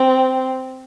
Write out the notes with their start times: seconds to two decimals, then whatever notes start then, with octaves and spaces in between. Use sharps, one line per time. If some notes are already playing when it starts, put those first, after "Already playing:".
Already playing: C4